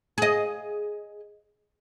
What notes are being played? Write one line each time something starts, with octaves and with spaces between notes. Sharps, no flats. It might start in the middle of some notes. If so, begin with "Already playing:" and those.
G#4 D#5